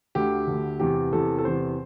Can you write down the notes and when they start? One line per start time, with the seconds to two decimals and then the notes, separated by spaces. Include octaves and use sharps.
0.15 D2 D3 G4
0.47 D2 D3
0.80 E2 C3 E3 G4
1.12 E2 C3 E3 A4
1.38 A4
1.45 E2 C3 E3 C5